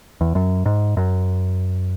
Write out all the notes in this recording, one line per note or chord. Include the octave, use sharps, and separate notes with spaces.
E2
F#2
G#2
F#2